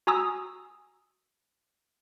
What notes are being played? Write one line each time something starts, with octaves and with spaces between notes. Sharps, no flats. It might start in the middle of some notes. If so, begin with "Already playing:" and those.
F#4 G#5 A#5 D#6 E6